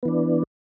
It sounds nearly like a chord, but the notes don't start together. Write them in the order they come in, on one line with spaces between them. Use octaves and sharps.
B3 E3 D4